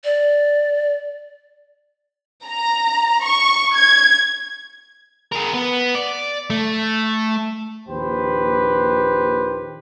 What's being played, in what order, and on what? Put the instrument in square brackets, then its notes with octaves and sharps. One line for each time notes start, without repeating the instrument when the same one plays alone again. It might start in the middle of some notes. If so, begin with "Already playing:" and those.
[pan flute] D5
[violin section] A#5
C#6
G#6
[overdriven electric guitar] G#4 A#4
B3
D5
A3
[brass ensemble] A#1 D#2 G4 B4 C5